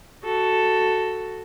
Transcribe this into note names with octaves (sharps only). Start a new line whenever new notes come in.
F#4 A4